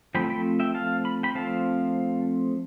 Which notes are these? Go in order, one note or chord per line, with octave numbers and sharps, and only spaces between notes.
F3 A3 C4 G5 B5
G5 B5
E5 G5
F5 A5
B5
G5 B5
F3 A3 C4 F5 A5